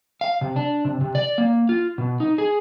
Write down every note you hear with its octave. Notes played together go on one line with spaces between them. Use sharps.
F5
C3
D4
C3
C3
D5
A#3
F4
B2
D#4
G#4